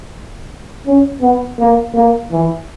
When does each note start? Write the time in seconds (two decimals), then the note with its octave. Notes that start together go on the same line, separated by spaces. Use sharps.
0.86 C#4
1.21 B3
1.59 A#3
1.94 A#3
2.32 E3